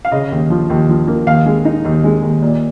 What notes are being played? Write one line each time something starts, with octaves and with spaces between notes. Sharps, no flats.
F5
C#3 D#5
D#2
F3
D#2
F3
A#3
D#2 F5
G#3
D#4
D#2
G#3
D#2
A#2